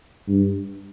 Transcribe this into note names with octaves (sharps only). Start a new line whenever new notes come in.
G2